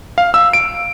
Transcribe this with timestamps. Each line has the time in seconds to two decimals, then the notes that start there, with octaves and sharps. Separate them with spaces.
0.18 F5
0.34 E6
0.53 D7